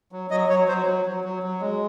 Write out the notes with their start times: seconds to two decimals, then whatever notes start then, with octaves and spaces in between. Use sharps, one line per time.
0.12 F#3
0.31 F#3 D#5
0.49 F#3 C#5
0.68 F#3 C5
0.86 F#3
1.05 F#3
1.24 F#3
1.43 F#3
1.61 G#3